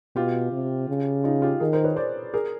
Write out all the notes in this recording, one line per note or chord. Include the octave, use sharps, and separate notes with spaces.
B2 F4 G4
C3
C#3
D#4 F4
F4 G4
D#3 G#4 A#4
A#4 C5
B4 C#5
C5 D5
G#4 A#4